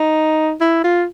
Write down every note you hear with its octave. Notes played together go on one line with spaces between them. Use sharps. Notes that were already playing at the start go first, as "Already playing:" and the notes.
Already playing: D#4
E4
F4